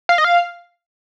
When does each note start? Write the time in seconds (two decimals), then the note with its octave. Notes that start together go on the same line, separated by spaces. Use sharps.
0.09 F5
0.18 D#5
0.24 F5